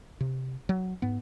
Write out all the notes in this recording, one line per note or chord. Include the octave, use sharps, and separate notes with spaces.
C3
F#3
G#2 B3